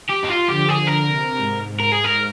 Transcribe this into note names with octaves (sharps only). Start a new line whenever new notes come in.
G4
D#4
F4
D3 F3 G4
G#4
D3
A#4
C3
G#2
G#2
A#4
G#4
A#4